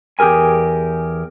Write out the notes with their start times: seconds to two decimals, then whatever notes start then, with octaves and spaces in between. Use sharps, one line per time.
0.19 E2 G4 G#4 A#4 G#5